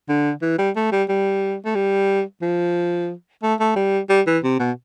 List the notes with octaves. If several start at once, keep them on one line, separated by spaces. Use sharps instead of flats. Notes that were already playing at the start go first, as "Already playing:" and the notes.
D3
E3
G3
A3
G3
G3
A3
G3
F3
A3
A3
G3
G3
E3
C3
B2